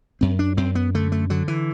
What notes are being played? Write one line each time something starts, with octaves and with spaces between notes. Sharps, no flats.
F#2 C4
D4
F#2 C4
B3
D3 A3
A3
D3 F#3
E3